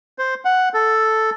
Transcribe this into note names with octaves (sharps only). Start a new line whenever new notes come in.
C5
F#5
A4